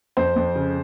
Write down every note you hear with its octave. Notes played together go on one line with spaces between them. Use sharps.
F2 C5
F2
C#3